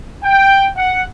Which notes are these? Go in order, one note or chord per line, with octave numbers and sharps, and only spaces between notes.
G5
F#5